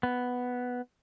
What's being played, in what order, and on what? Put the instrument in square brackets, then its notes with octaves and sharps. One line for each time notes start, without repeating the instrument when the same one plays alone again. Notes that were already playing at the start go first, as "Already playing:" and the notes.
[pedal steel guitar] B3